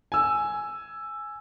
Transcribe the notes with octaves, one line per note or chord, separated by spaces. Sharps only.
G#5 E6